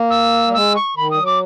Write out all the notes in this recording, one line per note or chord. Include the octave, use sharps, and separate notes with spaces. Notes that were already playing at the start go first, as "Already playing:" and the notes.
Already playing: A#3
E6
G3
G#3 E6
C#6
D#3 B5
G3 D#6
F#3
D6